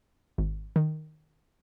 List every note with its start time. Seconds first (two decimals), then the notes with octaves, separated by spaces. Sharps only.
0.38 G#1
0.76 D#3